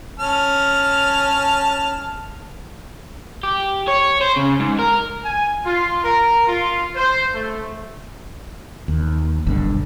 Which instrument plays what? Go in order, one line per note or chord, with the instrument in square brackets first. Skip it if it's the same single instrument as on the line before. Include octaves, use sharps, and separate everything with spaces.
[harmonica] C#4 A5 F6
[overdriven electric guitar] G4
C#5
C5
C#3
G#2
A#4
[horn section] G#5
F4
A#4
F4
C5
A3
[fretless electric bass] D#2
F#1 B1 G2 D3